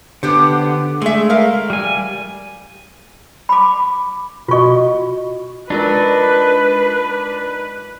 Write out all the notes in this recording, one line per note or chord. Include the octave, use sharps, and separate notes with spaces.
D3 B3 G4 C5
G#3 A3 G#4 E5
A#4 F5
G3 G#5
B5 D6
B2 F4 F#4 D#5 C#6
G#3 D4 D#4 F4 A#4 B4